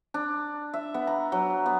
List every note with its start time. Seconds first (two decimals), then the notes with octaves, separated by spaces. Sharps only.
0.14 D4
0.74 E5
0.94 B3
1.07 A#5
1.32 F#3
1.66 B3